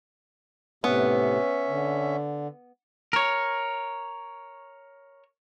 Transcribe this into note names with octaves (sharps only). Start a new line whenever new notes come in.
A2 C3 B3 C#4 E5
D3
A#4 C#5